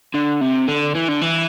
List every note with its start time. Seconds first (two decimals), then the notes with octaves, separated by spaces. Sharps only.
0.14 D3
0.41 C3
0.68 D3
0.95 E3
1.08 D3
1.21 E3